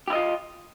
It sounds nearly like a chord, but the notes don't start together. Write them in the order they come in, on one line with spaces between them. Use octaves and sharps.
G4 E4 D#5 F4